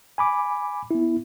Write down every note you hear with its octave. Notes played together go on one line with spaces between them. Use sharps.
G#5 B5 D6
B3 E4